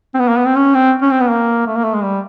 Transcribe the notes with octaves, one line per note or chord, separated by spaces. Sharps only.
C4
B3
A#3
B3
C4
C#4
C4
C#4
C4
B3
A#3
A3
A#3
A3
G#3
G3